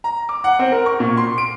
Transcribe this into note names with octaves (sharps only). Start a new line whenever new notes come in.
A#5
D6
F#5
C4
A#4
C#6
A#2
C6
D7